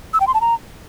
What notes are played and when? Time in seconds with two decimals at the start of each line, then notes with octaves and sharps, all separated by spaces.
0.13 E6
0.20 G5
0.27 C6
0.34 A5
0.41 A#5